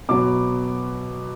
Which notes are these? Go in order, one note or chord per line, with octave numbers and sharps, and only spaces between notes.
B2 F#3 B3 D6